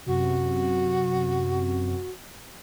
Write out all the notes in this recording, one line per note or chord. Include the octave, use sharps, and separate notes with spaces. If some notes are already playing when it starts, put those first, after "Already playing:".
F#2 C3 F#4